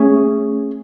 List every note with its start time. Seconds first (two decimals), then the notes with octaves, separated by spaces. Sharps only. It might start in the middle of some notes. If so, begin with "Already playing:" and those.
Already playing: A3 C#4 G#4 C#5